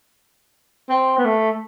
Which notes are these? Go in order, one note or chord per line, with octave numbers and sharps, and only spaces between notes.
C4
B3
A3